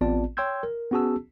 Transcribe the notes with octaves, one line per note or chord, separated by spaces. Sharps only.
A1 B3 C4 F4 D5 A5
C#5 G5 C6 E6 G6 G#6
A#4
B3 C#4 F#4 G#4 A5 E6